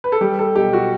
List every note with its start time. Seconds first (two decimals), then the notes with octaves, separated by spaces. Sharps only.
0.04 B4
0.12 A4
0.21 G3 G4
0.39 A4
0.55 B1 G4
0.73 F#4